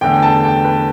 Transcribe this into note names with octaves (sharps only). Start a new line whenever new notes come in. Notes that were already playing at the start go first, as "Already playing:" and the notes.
E2 D3 A3 G5
A5
G5
B4